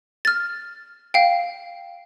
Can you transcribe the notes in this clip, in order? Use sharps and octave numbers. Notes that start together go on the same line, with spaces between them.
F6 A6
F5 G5